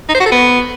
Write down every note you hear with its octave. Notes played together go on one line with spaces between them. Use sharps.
D#4
C5
F#4
A4
B3